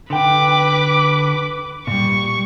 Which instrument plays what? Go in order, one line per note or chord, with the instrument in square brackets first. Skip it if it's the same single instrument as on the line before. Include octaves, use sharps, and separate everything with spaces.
[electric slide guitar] D3 G5 [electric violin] B4 D6
[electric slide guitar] A#2 G3 [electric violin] C#6